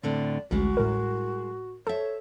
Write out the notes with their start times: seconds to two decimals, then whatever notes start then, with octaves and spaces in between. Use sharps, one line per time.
0.03 A2 D3 C4 D5
0.51 A1 D2 G3 G#3 F#4
0.77 A2 A#4
1.87 A4 C5 C#5 E5